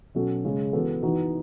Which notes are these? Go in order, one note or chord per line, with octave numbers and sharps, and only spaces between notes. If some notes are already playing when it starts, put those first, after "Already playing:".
B2 F#3 C#4 F#4 A4
C#3 G#3 C#4
E3 B3 F#4 A4
E3 B3 D#4 F#4